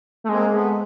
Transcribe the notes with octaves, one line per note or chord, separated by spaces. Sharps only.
A3
G#3 A#3 C4
A3 B3